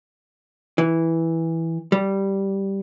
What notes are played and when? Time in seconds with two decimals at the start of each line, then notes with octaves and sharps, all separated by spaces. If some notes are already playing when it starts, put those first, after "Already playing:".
0.78 E3
1.92 G3